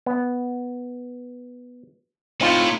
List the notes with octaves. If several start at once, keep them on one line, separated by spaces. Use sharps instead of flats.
B3
A2 C4 D#4 F4